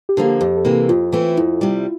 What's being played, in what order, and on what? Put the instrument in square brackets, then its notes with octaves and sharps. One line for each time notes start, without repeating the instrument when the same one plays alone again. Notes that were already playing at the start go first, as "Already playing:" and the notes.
[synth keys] G4
[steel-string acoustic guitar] D3 F3 A#3
[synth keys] G4
[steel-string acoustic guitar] F2 [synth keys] G4
[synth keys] A4
[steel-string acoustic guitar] C3 E3 A#3
[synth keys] A4
[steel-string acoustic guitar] F2 [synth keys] F4
[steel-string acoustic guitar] E3 A3 C4 E4
[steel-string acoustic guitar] F2 [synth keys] E4
[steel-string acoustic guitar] C3 G3